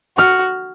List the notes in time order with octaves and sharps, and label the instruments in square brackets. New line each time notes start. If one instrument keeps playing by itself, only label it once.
[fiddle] F#4 [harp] F6